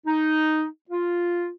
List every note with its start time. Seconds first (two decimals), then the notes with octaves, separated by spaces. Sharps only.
0.06 D#4
0.90 F4